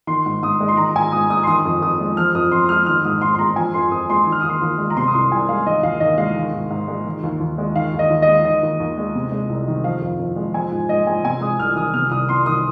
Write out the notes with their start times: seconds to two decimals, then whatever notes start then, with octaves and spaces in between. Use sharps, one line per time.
0.07 D#3 C6
0.26 G#2
0.42 G#2 D#6
0.60 G#3
0.68 C6
0.77 D#3 A#5
0.95 G#2 G#5
1.12 G#2 D#6
1.30 G#3 D#6
1.43 C6
1.47 D#3 D#6
1.65 F2
1.82 F2 D#6
2.00 G#3
2.17 F3 F6
2.34 F2 D#6
2.51 F2 C6
2.64 D#6
2.69 G#3 F6
2.86 D#3 F6
3.04 G#2 D#6
3.21 G#2 C6
3.35 C6
3.39 G#3 A#5
3.56 F3 G#5
3.74 F2 C6
3.91 F2 D#6
4.10 G#3 C6
4.26 D#3
4.32 F6
4.41 D#2 D#6
4.49 C6
4.61 D#2
4.78 G#3
4.90 A#5
4.97 C3 C6
5.07 D#6
5.14 C2 C6
5.32 C2 G#5
5.49 G#3 F5
5.66 D#3 D#5
5.83 D#2 F5
6.00 D#2 D#5
6.18 G#3 F5
6.36 D#3
6.53 G#2
6.70 G#2
6.88 G#3
7.06 D#3
7.23 D#2
7.40 D#2
7.58 G#3
7.76 D#3 F5
7.93 D#2
7.99 D#5
8.10 D#2
8.22 D#5
8.28 G#3
8.45 D#3 D#5
8.63 D#2
8.80 D#2
8.98 G#3
9.15 C3
9.32 G#3
9.49 C2
9.67 D#3
9.84 F3 F5
10.01 F2
10.19 F2
10.36 G#3
10.54 F3 G#5
10.71 G#2
10.89 G#2 D#5
11.07 G#3 G#5
11.24 C3 G#5
11.41 G#3 D#6
11.59 C2 F6
11.76 D#3 D#6
11.93 C3 F6
12.11 C2 D#6
12.29 C2 C6
12.46 D#3 D#6